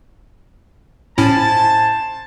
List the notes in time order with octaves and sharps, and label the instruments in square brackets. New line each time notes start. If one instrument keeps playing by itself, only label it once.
[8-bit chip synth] A2 C#4 E4 [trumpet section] C5 G#5 A5